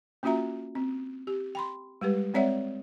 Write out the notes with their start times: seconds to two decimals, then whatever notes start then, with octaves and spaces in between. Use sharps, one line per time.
0.23 A#3 C#4 F4 F#4 E5 A#5
0.75 C4
1.27 G4
1.55 G5 B5 C6
2.01 G3 G#3 G4 B4
2.34 G#3 C4 C#5 D5 E5 F#5